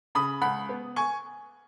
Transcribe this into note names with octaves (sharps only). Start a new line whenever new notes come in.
C#3 B5 D#6
C#2 F#5 B5
B3
G#5 C#6